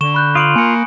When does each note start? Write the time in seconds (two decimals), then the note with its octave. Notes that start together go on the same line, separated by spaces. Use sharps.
0.01 D3 C#6 E7 G7
0.14 B5 F#6 G6
0.35 F4 D#6 D7 F#7
0.56 A#3 G#5 C#7